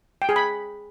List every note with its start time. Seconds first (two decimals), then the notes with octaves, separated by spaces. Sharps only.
0.22 G5
0.29 G#4
0.36 B5